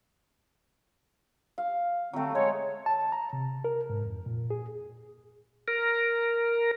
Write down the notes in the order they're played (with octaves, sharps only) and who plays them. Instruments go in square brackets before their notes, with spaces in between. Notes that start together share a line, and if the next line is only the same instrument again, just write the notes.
[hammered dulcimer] F5
[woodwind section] D3 C4 [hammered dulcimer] F#3 A3
[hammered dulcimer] G#3 [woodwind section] C#5
[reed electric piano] A5
A#5
C3
A#4
G#2
F2
A#2
G#4
[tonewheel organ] A#4